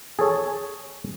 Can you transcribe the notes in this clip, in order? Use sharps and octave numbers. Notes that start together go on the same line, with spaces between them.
G#4 A4 C#5